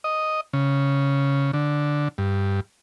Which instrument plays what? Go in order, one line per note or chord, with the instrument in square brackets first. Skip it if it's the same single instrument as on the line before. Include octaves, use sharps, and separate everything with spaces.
[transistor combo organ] D#5
C#3
D3
G2